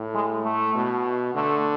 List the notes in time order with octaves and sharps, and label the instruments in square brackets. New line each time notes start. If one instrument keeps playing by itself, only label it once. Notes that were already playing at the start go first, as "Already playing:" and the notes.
Already playing: [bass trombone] A2
[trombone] G#3
A3
[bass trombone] B2
[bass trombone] D3 [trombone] A3